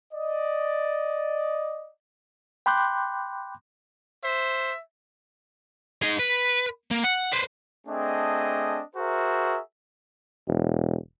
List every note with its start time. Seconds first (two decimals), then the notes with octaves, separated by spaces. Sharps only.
0.13 D5 D#5
2.66 G5 B5 C6 D6 F#6 G6
4.24 C5 E5
6.02 D#4 G#4
6.19 B4
6.91 A#3
7.04 F#5
7.33 B4 C5
7.87 A3 C4 D4 G#4 D#5
8.96 F#4 G#4 A#4 C5 E5
10.48 E1